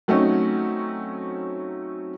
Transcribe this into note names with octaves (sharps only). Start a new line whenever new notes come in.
F#3 A3 C4 C#4 D#4